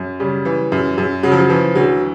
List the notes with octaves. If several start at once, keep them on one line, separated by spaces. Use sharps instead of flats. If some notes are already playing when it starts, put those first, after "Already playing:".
Already playing: F#2
C#3 G3
E3
F#2
F#2
C#3 F#3
F3
F#3
E3 F3
D2 F#3